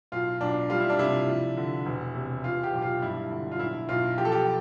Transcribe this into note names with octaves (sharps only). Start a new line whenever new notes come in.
B1 F4
B1 D4
G3 F4
E4
D4
C3 E4
F3
D3
E1
C3
E3 F4
G4
B1
F4
G2 E4
D3
F4
B1 E4
B1 F4
F3 G4
A4
G4